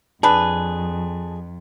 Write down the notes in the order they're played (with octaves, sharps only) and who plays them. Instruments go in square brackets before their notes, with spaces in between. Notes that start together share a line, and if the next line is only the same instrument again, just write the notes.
[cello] F2 [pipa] D4 B4 [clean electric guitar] G#4 [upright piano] A5